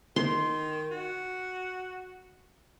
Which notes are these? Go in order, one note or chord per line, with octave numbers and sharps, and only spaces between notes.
D#3 C6
F#4